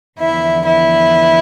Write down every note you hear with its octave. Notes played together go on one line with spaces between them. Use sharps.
E2 D3 F3 B3 E4 E5
E4 E5